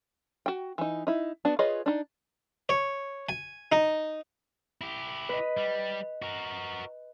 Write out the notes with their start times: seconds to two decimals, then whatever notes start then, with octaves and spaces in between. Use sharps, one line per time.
0.46 F#4 G5
0.78 E3 D#4
1.07 D#4 E4
1.45 B3 D4 F#4
1.59 F4 G#4 B4 C#5 D#5
1.86 D4 D#4
2.69 C#5
3.29 G#5
3.72 D#4
4.81 E4 G4
5.29 B4 D#5
5.57 G3
6.22 F#4 A#4